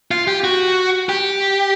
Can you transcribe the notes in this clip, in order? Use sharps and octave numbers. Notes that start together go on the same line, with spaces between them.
F4
G4
F#4
G4